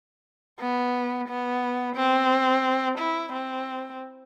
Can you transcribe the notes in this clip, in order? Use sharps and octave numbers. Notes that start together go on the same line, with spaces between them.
B3
B3
C4
E4
C4